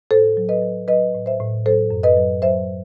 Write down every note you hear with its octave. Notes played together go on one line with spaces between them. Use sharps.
A2 A4 C5
F#3
B4 D#5
F#3
F#3 B4 D#5
A2
C5 E5
A2
F#3 A4 C5
F#2
B4 D#5
F#3
F#3 C5 E5